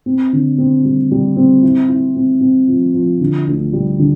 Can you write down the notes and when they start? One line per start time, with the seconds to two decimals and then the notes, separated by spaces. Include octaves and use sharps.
0.06 C4
0.33 D3
0.58 C4
0.85 G3
1.11 G3
1.36 C4
1.63 E4
1.89 E4
2.16 C4
2.41 C4
2.68 F3
2.94 F3
3.21 D3
3.47 D2
3.73 G3
3.99 D3